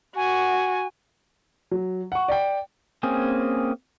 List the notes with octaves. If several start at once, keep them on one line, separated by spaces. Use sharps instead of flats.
F#4 G#5
F#3
F#5 C#6
D5 G5
A#3 C4 C#4 G#4